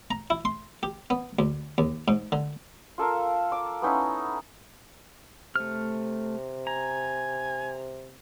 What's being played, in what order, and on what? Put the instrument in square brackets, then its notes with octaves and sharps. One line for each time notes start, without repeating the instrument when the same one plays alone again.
[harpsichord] A#5
E4
C6
G4
B3
D2
D#2
G#2
D3
[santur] F4 A4 A#4 F5
D6
B3 C#4 D#4 E4
[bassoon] C3 [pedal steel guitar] A3 F6
[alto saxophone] G#5 [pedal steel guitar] A#5